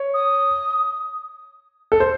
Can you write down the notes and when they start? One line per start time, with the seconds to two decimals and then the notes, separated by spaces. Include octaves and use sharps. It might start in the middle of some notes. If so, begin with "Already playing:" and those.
Already playing: C#5
0.14 D#6
1.92 A4
2.00 C5